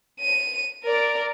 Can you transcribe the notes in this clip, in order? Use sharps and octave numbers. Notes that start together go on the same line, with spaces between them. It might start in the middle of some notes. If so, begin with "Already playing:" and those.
D#7
A#4 D5